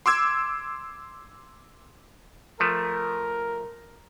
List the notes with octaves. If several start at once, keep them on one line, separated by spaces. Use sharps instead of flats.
C6 D6 E6 G#6
F3 A3 A#4